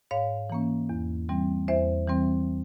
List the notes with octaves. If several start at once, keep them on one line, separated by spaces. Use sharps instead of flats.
G#2 C#5 F5
E3 A#3 C#4
E2
E3 G3 C4
E2 C5 E5
E3 G3 C4